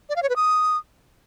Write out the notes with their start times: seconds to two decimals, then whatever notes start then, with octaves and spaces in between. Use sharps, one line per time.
0.09 D5
0.16 F5
0.23 C#5
0.29 B4
0.36 D#6